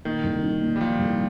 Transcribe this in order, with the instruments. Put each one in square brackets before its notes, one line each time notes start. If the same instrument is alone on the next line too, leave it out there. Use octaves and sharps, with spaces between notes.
[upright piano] A#2 [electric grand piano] D#3
[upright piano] C2
D#4
A#2
[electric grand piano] G3
[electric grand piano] F3 [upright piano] A#3
[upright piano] C2